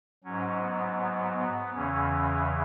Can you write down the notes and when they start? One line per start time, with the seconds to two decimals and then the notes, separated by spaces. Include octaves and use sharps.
0.24 G#2 F#3 C#4
0.61 B3
0.99 B3
1.37 B3
1.74 E2 C#3 E3 C#4